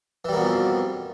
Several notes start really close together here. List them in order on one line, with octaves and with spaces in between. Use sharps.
E3 G3 A#3 B2 F2